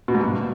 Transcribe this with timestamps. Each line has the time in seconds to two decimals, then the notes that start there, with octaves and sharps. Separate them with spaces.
0.08 B2
0.15 G#2
0.21 G2